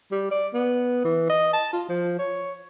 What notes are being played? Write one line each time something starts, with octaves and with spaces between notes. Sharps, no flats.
G3
D5
B3
E3
D#5
A5
F4
F3
C#5